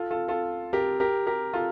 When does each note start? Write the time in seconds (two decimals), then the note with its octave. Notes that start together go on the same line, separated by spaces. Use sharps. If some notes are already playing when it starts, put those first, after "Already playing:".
Already playing: F4 A4
0.11 F4 A4
0.28 F4 A4
0.73 G4 A#4
1.00 G4 A#4
1.27 G4 A#4
1.53 F4 A4